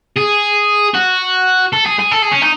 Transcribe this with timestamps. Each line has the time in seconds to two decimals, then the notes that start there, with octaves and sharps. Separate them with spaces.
0.17 G#4
0.94 F#4
1.73 A4
1.86 G#4
1.99 G#4
2.11 A4
2.22 G#4
2.31 C#4
2.42 D#4